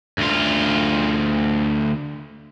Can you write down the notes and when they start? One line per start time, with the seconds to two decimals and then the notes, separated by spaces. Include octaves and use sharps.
0.18 D2 F4